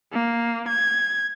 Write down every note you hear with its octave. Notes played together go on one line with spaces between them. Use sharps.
A#3
G#6